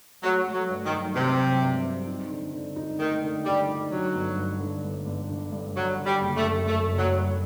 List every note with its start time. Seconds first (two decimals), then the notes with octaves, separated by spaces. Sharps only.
0.23 F#3 A3
0.46 A3
0.54 F#3
0.69 G2
0.85 D#3
0.93 F#3
1.15 C3 C4
1.38 F#3
1.61 G2
1.84 C4
2.07 D#4
2.30 D3
2.53 D3
2.76 D#4
2.99 D#3 A3
3.22 D3
3.45 D3 G3
3.68 D#4
3.91 D3 F#3
4.15 G1
4.37 G2
4.60 D3
4.84 G1
5.06 G1
5.29 D3
5.52 G2
5.76 F#3 G3
5.98 D3
6.06 G3
6.21 F#1
6.37 A3
6.44 F#2
6.67 F#2 A3
6.91 F#1
6.98 F#3
7.13 G3